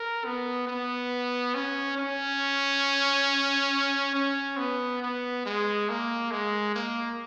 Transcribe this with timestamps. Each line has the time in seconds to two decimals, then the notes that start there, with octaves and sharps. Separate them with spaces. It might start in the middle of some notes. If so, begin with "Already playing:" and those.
Already playing: A#4
0.25 B3
0.67 B3
1.55 C#4
1.98 C#4
4.15 C#4
4.58 B3
5.02 B3
5.46 G#3
5.89 A#3
6.32 G#3
6.75 A#3